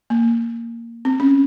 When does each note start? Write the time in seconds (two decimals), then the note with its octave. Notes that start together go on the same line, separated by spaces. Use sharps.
0.10 A#3
1.05 C4
1.20 C#4